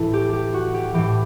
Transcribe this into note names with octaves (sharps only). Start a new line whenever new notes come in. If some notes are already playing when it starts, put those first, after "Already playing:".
Already playing: A2 E3 A4
G4
G4
F#4
G4
A2 E3 G4